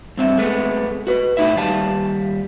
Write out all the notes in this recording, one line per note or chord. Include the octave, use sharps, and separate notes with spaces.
G2 C4 E5
G#3 A3 B3
F#4 B4
A2 C#4 D#4 E4 E5
D#2 G3 F5 A5